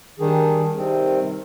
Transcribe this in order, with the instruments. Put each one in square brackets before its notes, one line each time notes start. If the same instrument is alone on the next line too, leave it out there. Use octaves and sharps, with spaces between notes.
[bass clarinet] D#3 [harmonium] G3 D4 G#4
[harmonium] C3 D#3 G3 C4